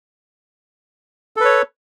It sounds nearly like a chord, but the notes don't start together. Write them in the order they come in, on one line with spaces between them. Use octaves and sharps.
A4 B4 C#5